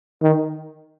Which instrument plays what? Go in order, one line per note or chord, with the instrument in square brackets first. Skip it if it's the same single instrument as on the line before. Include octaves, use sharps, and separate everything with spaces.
[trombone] D#3